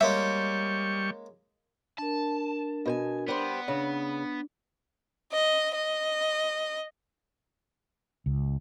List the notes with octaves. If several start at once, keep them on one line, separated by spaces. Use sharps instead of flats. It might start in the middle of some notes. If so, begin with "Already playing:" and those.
G3 G#3 A#3 C#4 E5 C#6
D4 A#4 A5
B2 C5 G#5
G3 B3 C5
C#3 D4
D#5
D#5
C#2